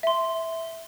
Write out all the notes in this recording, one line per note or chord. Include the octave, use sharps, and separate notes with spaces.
E5 C6